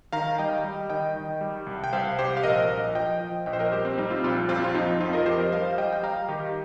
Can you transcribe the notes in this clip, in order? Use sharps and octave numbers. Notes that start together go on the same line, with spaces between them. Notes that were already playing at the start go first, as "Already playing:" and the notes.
D#3 F5 A#5
G3 D#5 G5
G3
D#3 D#5 G5
D#3
G3
C2
G5
C2 C5 F5
C2 G4 C5
F5
A#1 A#4 D#5
A#1
F3 D#5 G5
F3
A#1 D#5 G5
C5
A#4 D#5
G3 G4 C5
C4
G3 D#4
C4 F4
A#1 C4 F4
F2 C4 F4
F4
F3 D#4
F2 C4 F4
A#4 D#5
F3 G4 C5
A#4 D#5
G3 C5 F5
F5
G3 D#5 G5
G5
G3 F5 A#5
D#3 D#4 G4